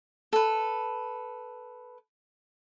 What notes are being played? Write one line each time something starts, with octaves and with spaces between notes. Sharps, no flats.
A4 B4